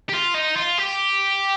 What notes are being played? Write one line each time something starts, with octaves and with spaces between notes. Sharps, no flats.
G4
F4
D#4
F4
G4